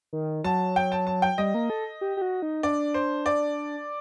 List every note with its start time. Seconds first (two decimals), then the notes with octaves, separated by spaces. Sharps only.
0.13 D#3
0.44 F#3 A5
0.76 G5
0.92 A5
1.07 A5
1.22 G5
1.38 G3 D#5
1.54 A#3
1.70 A4
2.01 G4
2.17 G4
2.22 F#4
2.42 D#4
2.63 D4 D5
2.94 C5
3.26 D5